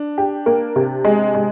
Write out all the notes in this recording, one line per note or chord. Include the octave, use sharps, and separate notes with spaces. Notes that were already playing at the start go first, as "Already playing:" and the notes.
Already playing: D4
G4
A#3
C3
G#3
G#3